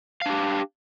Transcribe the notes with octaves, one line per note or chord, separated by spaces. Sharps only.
D4 G4 F5